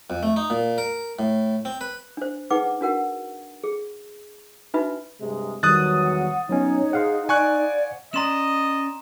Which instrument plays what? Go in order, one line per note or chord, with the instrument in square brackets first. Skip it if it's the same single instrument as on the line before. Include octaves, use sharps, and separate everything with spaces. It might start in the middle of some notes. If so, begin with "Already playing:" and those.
[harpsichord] F2
A3
D#4
A#2
A#4
A2
C4
B4
[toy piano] D4 C5
D#4 G#4 B4 F#5 D6
D4 F#4 A#4 F#5
G#4
D4 D#4 F#4 B4 E5 B5
[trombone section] G2 C3 G#3
[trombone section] E2 F#3 [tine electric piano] D#3 G3 [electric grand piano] D#6 F#6 A6
[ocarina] F#5
[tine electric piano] F#3 B3 C#4 [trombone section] D#4 [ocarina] C#5
[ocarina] G#4 [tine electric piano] C5 F5 F#5
[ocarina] D5 [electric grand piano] G#5 C#6 F#6
[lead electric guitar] C#4 D5 [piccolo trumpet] D#5 [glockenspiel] A#5 C6 E7